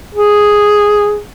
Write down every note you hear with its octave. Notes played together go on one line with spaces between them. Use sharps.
G#4